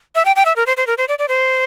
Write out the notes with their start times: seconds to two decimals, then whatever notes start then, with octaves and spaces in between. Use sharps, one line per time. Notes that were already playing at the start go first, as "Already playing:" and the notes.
0.15 E5
0.25 G5
0.36 G5
0.46 E5
0.56 A#4
0.67 C5
0.77 C5
0.87 A#4
0.98 C5
1.08 D5
1.19 D5
1.28 C5